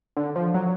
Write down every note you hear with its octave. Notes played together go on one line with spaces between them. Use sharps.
D3
F3
F#3